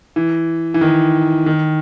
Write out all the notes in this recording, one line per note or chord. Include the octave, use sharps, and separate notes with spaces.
E3
E3
D#3
D#3